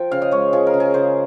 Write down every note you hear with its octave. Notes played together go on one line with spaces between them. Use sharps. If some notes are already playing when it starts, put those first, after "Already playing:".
Already playing: F3 G5
C#3 F5
D#5
G#3 C#5
F3 G#4
A#4
C#3
G#4
C#3 C5